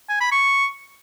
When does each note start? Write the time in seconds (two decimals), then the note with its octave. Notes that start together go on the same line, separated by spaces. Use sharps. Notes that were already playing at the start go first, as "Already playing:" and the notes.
0.09 G#5
0.21 B5
0.32 C#6